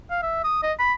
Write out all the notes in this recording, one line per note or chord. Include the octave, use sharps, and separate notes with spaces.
F5
E5
D#6
D#5
B5